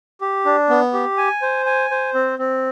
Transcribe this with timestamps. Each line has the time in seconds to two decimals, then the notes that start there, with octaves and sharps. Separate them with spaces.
0.21 G4
0.45 D4
0.69 B3
0.93 G4
1.17 G#5
1.42 C5
1.66 G#5
1.91 C5
2.14 C4
2.39 C4